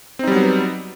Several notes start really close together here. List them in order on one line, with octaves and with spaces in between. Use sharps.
C4 D#4 G3 F#3 B3